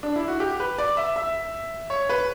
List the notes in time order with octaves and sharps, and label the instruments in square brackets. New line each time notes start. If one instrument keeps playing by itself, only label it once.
[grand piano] D4
E4
F#4
G4
B4
D5
E5
E5
C#5
B4